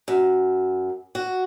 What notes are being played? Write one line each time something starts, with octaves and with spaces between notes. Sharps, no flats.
F#2
F#4